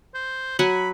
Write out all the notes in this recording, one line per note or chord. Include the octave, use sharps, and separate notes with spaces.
C5
F#3 F#5 G#5 B5